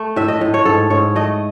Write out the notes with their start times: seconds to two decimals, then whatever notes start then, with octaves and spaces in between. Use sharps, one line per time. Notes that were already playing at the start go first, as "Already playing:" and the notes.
Already playing: A3
0.16 A2 E5
0.28 D#5
0.41 A2
0.54 C#5
0.65 G#2 A4
0.90 G#2 C#5
1.15 A3 D#5